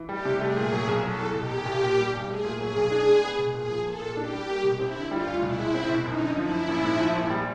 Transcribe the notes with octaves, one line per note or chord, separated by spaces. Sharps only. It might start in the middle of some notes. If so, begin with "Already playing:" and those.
Already playing: E3
G3 G4
C3
A3 G#4
A#2
F#3
B1
F#3 A4
E2
B2 G4
E1
B1
A#2
G3
B1
A3 G#4
A#2
F#3 G#4
B1
D4
G#3
B3
B2
A#2 G#4
F3
A#3 A4
A#2
D4 G4
G3
A#3
B2
C4 E4
D3
G3 F4
D2
B2 E4
G#3
C4
B2
F#2 D#4
D3
F3 E4
F#2
A#1
G#2
F3
A#1
G3